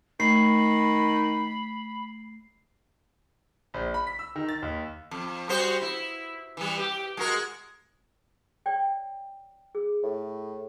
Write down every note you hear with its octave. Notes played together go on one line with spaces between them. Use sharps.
D#3 A3 B5 C7
A#1
B5
B6
E6
D#3
A6
D#2
F2
G3 F#4 C5
E4
E3 G3
G4
G#3 F#4 A#4
C#5 D5 G5
G#4
A2